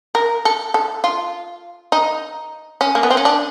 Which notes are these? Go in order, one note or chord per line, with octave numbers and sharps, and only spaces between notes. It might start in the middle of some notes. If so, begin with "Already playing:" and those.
A#4
A4
A4
F4
D#4
C#4
A#3
B3
C4
C#4
D4